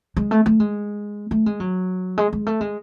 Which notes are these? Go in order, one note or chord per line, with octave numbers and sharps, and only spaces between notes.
G#3
A3
A3
G#3
A3
G#3
F#3
G#3
G#3
A3
G#3